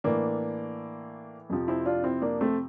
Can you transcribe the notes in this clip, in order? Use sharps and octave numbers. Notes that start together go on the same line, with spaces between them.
A2 E3 A#3 D4
F2 C3 F3
C4 E4
D4 F4
C4 E4
A#3 D4
A3 C4